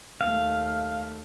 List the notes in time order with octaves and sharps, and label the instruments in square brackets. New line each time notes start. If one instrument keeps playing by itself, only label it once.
[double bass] D#2 A3 [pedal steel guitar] F5